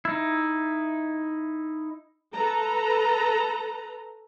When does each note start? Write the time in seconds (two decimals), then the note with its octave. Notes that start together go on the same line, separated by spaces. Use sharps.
0.05 D#4 E4
2.34 A4 B4 A#5